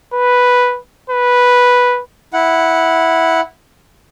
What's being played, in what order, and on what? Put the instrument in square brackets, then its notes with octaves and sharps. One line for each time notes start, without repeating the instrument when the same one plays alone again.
[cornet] B4
B4
[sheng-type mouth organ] E4 F#5